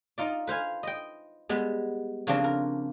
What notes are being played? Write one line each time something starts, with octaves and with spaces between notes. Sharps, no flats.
D#4 F4 D5
B4 C5 F5 G#5
D#5 G5
G3 G#3 B3
C#3 F3 A#3 C4 D4
A#4